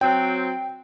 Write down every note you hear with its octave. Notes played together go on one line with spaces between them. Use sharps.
F#3 C4 G5